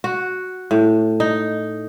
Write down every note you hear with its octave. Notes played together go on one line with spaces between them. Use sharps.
F#4
A2
D#4